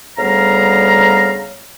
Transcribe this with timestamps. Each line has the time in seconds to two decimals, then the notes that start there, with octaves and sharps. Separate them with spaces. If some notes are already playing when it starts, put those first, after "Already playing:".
0.18 D2 C#3 G3 B3 F5 A#5